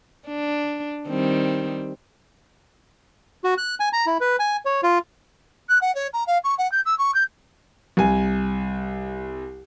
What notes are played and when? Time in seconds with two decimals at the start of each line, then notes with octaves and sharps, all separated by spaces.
0.28 D4
1.07 D#3 G3 C4
3.44 F#4
3.58 F#6
3.80 G#5
3.93 A#5
4.06 E4
4.21 B4
4.39 G#5
4.65 C#5
4.83 F4
5.69 F#6
5.81 F#5
5.95 C#5
6.13 A#5
6.27 F5
6.44 C#6
6.58 F#5
6.72 G6
6.85 E6
6.98 C#6
7.14 G6
7.97 C2 G#5